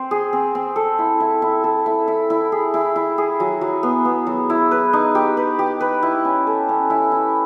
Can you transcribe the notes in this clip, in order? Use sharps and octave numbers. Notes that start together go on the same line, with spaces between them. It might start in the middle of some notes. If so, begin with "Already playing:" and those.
Already playing: C4 C5
G#4
C4
C4
A4
E4
E4
E4
A4
E4
E4
E4
G#4
E4
E4
G#4
F#3
F#3
B3
B3
F#3
E4
B4
D#4
G4
B4
G4
B4
E4
C#4
A4
C#4
E4
E4